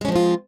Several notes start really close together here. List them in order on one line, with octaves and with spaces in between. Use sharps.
G#3 C#4 F3 C4 F4